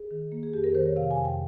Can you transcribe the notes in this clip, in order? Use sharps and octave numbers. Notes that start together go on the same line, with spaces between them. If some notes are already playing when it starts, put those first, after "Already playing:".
Already playing: G#4
D#3
A#3
G#4
F2 G4
A#4
D#3 C5
C#5
C3 F5
G#5
F2
G5